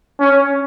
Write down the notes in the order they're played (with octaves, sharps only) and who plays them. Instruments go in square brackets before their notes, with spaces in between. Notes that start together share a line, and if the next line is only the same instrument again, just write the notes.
[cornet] C#4